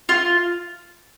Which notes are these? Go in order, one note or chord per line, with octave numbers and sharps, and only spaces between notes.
F4